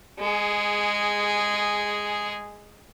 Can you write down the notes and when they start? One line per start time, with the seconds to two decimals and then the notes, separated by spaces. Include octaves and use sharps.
0.19 G#3 G#4